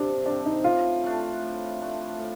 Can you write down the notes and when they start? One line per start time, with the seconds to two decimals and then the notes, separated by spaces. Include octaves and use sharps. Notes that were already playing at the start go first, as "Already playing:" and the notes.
Already playing: C3 F3 C4 D4
0.26 F3 C4 D4
0.46 D#4
0.64 A2 F4
1.04 A3 D4
1.42 A2
1.81 A3 D4
2.20 A2